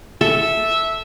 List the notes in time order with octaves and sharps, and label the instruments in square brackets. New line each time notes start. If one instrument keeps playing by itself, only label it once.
[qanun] A4 [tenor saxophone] E5